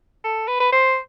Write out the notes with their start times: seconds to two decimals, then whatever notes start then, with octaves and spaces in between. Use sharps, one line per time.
0.24 A4
0.47 B4
0.60 B4
0.72 C5